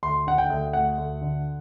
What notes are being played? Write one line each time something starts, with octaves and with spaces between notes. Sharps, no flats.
D2 C6
D3 F#5
G5
D2
A3 F#5
D2
D3